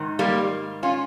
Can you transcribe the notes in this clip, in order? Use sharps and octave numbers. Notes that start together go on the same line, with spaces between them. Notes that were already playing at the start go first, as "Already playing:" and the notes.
Already playing: G#2 D#3
G3 A#3
C#4 F4